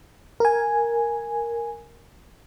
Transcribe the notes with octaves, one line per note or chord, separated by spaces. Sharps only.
A#4 G#5